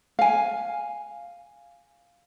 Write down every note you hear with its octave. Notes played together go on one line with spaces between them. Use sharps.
F5 G#5